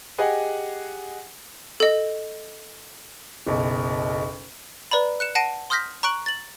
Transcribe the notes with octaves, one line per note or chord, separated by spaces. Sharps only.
G4 G#4 D#5 F#5 G#5
A4 D#5
F#1 B1
B4 D5 A#5 B5
F#6 C#7 E7
F#5 A5 A#6 C7 D7 D#7
C6 D#6 F6 G6 A#6 B6
A#5 C#6 F#6 D7 F#7
A6 F#7